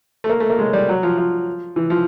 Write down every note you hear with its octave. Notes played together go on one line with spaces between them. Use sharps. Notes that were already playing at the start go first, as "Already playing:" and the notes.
A3
A#3
A3
A#3
G#3
G3
F#3
F3
F3
E3
F3